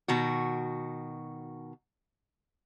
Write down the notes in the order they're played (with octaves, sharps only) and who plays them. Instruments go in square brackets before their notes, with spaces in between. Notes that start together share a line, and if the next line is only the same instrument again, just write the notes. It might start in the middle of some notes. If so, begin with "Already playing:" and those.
[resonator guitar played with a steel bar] B2 D#3 F#4